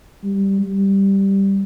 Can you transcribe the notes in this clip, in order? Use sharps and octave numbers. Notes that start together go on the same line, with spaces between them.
G3
G3